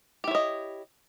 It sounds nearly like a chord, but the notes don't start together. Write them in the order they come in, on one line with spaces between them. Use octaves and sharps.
G4 E4 C#5 D#5